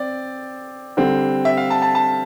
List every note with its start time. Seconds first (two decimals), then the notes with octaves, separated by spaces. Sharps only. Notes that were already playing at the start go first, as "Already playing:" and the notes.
Already playing: C4 D5
0.97 D3 G3 C4
1.45 E5
1.57 F5
1.70 A5
1.82 A5
1.95 A5